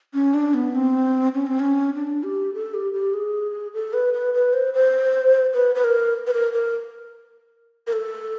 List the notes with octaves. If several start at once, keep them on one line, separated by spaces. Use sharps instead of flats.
C#4
D4
B3
C4
C#4
C4
C#4
D4
G4
A4
G4
G4
G#4
A4
B4
B4
B4
C5
C5
B4
B4
A#4
B4
A#4
A#4
A#4
A4